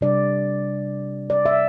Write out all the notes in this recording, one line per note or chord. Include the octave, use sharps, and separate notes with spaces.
C3 G3 D4 D5
D5
E5